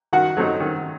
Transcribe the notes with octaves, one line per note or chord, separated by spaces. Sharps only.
D#3 F#4 F#5
F#3 A3 C4 D#4
D#3